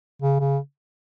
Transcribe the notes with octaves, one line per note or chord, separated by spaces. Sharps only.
C#3
C#3